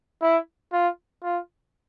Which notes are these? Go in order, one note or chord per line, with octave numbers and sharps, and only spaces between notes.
E4
F4
F4